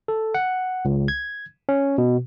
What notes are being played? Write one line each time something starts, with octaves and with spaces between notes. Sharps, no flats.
A4
F#5
C#2
G#6
C#4
B2